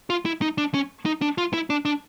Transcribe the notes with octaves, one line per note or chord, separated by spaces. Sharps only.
F4
E4
D#4
D4
C#4
D#4
D4
F4
E4
D4
D4